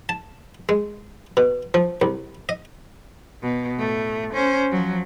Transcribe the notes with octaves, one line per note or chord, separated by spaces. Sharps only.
A5
G#3
B2
F3
C2
D#5
B2
A2 A3
C#4 C5
F3 F#3